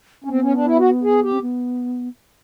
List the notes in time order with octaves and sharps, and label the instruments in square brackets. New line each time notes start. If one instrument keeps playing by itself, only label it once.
[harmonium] C#4
[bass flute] B3 [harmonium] C4
[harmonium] C#4
D4
E4
F#4
G#4
G4
[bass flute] C4
B3